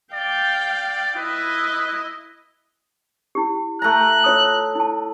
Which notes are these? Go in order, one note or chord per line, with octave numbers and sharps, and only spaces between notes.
D5 F5 G5
E4 B4 D#5
E4 G4
A3 A#5 F#6
F4 C#5 D#6
E4 A5